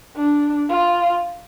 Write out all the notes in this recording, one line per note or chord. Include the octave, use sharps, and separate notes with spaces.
D4
F4